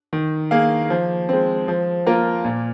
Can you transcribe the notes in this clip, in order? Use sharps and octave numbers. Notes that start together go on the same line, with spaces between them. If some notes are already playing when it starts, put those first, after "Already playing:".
D#3
A#3 G#4 F5
F3
G#3 C4
F3
A#3 F4 A#4
A#2